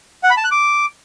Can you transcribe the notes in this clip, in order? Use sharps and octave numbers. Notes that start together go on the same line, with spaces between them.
F#5
B5
A5
F#6
D6